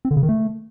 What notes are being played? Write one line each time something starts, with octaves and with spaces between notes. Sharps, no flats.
C4
D3
C#3
D#3
A3